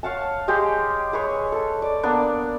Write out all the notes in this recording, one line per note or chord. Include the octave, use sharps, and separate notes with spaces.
C#5 F5 F#5 A5
G#3 G4 G#4 D#5
G#4 B4 C#5
A4
D5
A#3 B3 D4